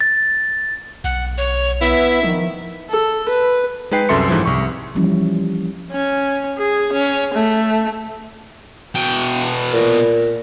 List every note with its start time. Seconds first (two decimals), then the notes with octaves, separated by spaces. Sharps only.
0.01 A6
1.04 B1 F#5
1.38 C#5
1.82 B3 E4 E5
2.23 D#3 F3
2.90 A4
3.29 B4
3.91 G#3 D#4 B4 G5 C7
4.09 C2 F#2 A4 E5 C6 C#7
4.29 G#2 E3 F3
4.46 C2 C#6
4.95 E3 F3 G3 A#3 C#4 E4
5.92 C#4
6.58 G#4
6.93 C#4
7.34 A3
8.95 B2 G5
9.73 A#2